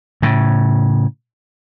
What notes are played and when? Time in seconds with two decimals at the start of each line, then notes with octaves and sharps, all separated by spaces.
0.22 A2 C#3